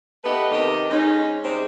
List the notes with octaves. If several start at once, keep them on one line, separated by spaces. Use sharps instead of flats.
A3 B3 G4 B4 D#5
C3 D#3 G4 A4 D#5
G#2 G#3 C#4 D#4
C3 G3 G#3 C4